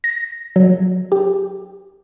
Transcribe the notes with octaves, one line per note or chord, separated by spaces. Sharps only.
A#6
F#3
G4